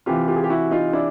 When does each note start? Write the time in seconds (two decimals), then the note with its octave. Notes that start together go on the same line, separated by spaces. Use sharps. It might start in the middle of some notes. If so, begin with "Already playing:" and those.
0.06 C3 E3 F4 G4
0.28 F4 G4
0.36 G#4
0.44 G4
0.50 E4 F#4
0.71 D#4 F4
0.93 D4 E4